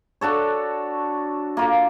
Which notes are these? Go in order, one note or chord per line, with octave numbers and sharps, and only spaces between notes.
D4 F#4 A4 C#5
A#3 F4 D6